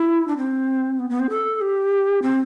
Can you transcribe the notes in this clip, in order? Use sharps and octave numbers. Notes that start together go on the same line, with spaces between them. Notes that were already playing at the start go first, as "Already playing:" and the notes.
Already playing: E4
D4
C4
B3
B3
C4
A4
G4
C4